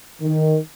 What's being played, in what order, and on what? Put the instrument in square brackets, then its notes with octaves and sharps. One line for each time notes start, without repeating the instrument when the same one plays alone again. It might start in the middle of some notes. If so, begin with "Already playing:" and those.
[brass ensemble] D#3